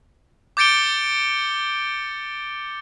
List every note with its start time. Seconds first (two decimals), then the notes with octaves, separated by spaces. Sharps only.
0.57 D6 G6 A6 C#7 D7 G7